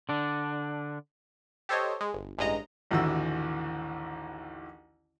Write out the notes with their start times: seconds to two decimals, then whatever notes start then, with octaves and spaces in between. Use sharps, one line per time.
0.09 D3 D4
1.69 G4 A4 C5 C#5 D#5
2.01 G#3
2.13 G1
2.38 A1 G2 G#3 D#5 A#5
2.91 A1 D#2 D3 E3 F#4 E6